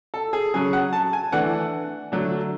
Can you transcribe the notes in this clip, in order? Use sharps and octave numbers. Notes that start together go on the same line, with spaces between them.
A4
G#4
C#3 F#3 C#4 G#4
F#5
A5
G#5
E3 A3 D4 F#5
D3 F#3 A3 D4